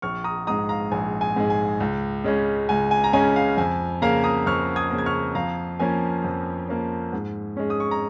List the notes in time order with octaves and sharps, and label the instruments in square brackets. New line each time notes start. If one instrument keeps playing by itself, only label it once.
[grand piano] A#1 C#6 F6
A#5 D#6
G#2 G#3 A#5 D#6
F5 A#5
A#1 G#5
G#5
G#2 G#3
G#5
C#2
C#3 G#3 C#4
C#2 G#5
G#5
A#5
C#3 G#3 C#4 G#5
F5
F2 G#5
C#3 A#3 F5 A#5
A#5 D#6
F2 C#6 F6
D#6 G#6
C#3 A#3
G#6
C#6 F6
F2 F5 A#5
F3 A#3 C#4 G#5
F2
F3 A#3 C#4
G#2
G#3 C#4
D#6
C#6
A#5